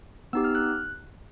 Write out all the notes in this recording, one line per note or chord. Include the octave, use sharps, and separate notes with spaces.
B3 D#4 G4 E6
F6
F#6